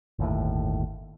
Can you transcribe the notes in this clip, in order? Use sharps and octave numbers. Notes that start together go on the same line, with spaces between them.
G1 D#2 A2